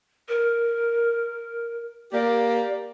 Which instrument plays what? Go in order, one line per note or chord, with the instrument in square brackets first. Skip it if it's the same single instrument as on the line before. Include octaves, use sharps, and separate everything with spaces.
[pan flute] A#4
[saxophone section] A#3 G4 [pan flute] D5